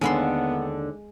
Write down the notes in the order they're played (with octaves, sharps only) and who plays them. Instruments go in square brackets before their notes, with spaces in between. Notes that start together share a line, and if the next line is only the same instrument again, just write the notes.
[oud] D#2 D3 [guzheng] G#3 B5 C6 [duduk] B3 [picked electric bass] D4